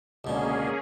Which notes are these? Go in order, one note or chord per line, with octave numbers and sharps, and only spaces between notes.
C#2 B2 D3 A#3 C#4 G#4